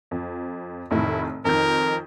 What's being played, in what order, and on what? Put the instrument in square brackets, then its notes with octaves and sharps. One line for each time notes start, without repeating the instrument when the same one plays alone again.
[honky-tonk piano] F2
[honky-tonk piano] F1 A2 D#3 [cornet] E4
[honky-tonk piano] F2 D#3 G6 [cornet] A#4